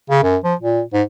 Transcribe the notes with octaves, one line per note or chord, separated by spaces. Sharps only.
C#3
F#2
F3
A#2
G#2